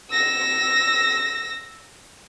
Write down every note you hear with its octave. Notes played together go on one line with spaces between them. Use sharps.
E6 A#6